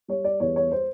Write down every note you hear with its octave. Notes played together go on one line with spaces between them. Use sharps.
G3 C#5
D5
E2 C#5
C#5
C5